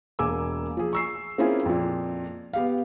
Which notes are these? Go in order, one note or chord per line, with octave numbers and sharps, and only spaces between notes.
E1 A#3 G#5 D6 E6
F3 G#4
C#6 E6 C7
A#3 C4 C#4 E4 F4 G#4
F2 A#2
B3 G4 F5